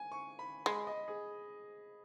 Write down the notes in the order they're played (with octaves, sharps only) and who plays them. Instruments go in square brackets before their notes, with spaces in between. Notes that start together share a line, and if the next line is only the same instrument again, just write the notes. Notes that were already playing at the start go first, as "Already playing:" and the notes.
Already playing: [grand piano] G#5
C#6
B5
[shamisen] G#3 [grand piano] B5
[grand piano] D#5
G#4